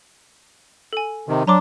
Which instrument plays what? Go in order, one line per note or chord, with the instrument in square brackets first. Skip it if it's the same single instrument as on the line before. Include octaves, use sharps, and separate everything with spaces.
[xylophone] A4 G#5
[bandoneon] C3 D#3
[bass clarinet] F#3 [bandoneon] D4 [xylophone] A#5 C6 D6